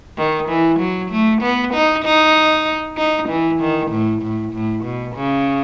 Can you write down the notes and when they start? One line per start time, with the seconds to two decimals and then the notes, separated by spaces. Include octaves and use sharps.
0.18 D#3
0.49 E3
0.80 F#3
1.11 A3
1.42 B3
1.74 D#4
2.05 D#4
2.98 D#4
3.29 E3
3.61 D#3
3.91 A2
4.23 A2
4.53 A2
4.84 B2
5.16 C#3